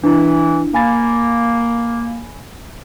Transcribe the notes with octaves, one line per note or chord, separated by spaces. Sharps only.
E3 D4 E4
A#3 G#5 B5 A6